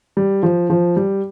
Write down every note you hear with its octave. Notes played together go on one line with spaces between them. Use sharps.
G3
F3
F3
G3